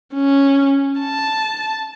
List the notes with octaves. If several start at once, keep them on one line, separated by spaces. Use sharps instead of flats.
C#4
A5